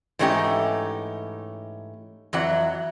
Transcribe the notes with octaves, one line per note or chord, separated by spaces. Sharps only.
G#2 E3 A3 C#4 D#4 G4
F2 E3 F#3 F#5